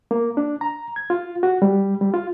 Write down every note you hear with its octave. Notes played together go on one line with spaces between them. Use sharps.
A#3
D4
A#5
G#6
F4
F#4
G3
G3
F4